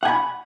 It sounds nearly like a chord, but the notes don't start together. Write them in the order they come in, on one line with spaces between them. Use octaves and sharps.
F#5 G#5 B5